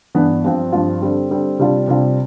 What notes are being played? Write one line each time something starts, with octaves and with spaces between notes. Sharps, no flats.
G2 E3 B3 D4
G2 F3 C4 F4
G2 F3 C4 F4
D3 G3 C4
D3 G3 C4
C3 G3 D4 F4
C3 G3 D4 F4